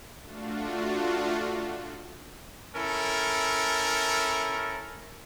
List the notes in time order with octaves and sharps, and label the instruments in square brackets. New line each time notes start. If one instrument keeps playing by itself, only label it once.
[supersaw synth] A3 D4 F4 F#4
[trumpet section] C#4 E4 A4 A#4